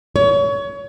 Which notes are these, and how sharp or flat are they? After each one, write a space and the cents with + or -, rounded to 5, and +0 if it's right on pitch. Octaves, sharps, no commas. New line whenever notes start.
C#5 +25